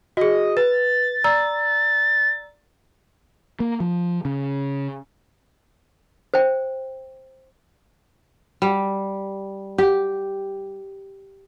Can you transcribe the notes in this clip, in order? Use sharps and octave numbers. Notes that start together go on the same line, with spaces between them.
F#4 G#4 D#5
B4 A6
D5 A#5 E6
A#3
F3
C#3
C5 G5
G3
G4